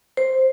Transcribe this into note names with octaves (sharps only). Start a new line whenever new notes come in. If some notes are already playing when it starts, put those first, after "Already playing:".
C5